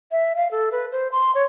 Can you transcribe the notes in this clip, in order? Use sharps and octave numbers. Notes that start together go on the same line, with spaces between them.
E5
F5
A4
B4
C5
C6
C#5